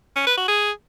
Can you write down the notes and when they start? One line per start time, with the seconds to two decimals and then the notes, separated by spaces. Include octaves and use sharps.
0.16 C#4
0.27 B4
0.37 F#4
0.48 G#4